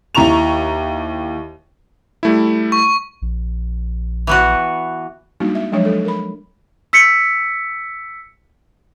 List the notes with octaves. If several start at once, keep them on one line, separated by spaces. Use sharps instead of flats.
D#2 E4 A#5 C#6 F7
G3 A3 E4
C#6
A#1
E3 B3 F#4
G3 G#3 A#3 D4 D#4 F#4
E5
F3 F#3 G#3 D4 C#5
A4
A#4 B5
E6 B6 C#7